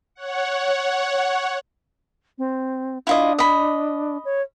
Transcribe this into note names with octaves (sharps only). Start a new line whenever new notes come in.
C#5 F#5
C4
D4 E4 F4 D#5
D#5 B5
C#5